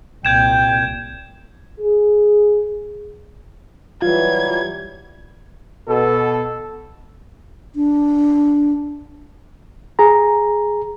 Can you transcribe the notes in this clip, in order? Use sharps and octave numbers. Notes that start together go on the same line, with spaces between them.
C2 A#2 G5 G6 G#6 E7
G#4
E3 F#3 G3 F4 G#6
B2 A4
D4
G#4 A#5